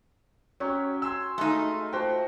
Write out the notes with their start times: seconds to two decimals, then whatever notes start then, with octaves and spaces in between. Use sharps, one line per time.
0.60 F#3 C#4 G4 C#5
1.02 G#5 C6 E6
1.38 G#3 A3 D#4 E4 F5
1.93 F3 F#4 C5 G5